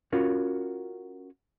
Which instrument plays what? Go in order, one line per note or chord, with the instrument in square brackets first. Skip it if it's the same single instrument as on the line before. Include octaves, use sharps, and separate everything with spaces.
[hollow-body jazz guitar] C#4 F4 F#4 A#4